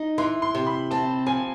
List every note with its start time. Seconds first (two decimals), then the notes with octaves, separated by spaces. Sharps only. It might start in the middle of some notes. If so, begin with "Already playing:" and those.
Already playing: D#4
0.18 E3 C6
0.42 C6
0.55 C3
0.67 B5
0.91 C4 A5
1.26 F3 G#5